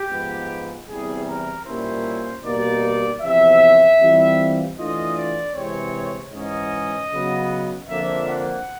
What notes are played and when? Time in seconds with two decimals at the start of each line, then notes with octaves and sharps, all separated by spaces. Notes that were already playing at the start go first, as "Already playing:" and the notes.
Already playing: G4
0.10 G#2 F3 G#3 B3
0.88 E2 C3 E3 G3 G#4
1.27 A#4
1.66 A#2 G3 A#3 C#4 E4 C5
2.44 B2 G3 A#3 D#4 D5
3.22 E2 C3 F3 E5
4.00 E3 G3 C4 F4
4.77 E3 A3 D4 F4 D#5
5.17 D5
5.55 C3 E3 G#3 C4 C#5
6.33 G#2 E3 G#3 C#4 D#5
7.12 C#3 F#3 B3
7.89 F2 D3 F3 A#3 D4 E5
8.28 F#5